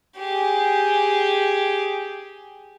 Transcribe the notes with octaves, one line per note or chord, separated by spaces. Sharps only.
G4 G#4